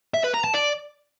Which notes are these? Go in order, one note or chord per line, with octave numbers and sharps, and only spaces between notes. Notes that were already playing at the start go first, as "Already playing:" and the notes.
E5
B4
A#5
A5
D5